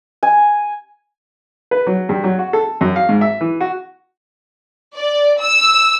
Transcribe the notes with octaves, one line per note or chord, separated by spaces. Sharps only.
G#5
B4
F#3
G2
F#3
F#4
A4
F#2
F5
G#2
E5
E3
F#4
D5
E6